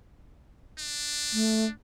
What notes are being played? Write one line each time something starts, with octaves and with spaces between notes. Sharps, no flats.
D4
A3